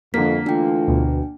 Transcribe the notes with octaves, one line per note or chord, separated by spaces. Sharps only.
F2 D3 A#3 B6
E3 A3 D4 F4 G5
D2 B2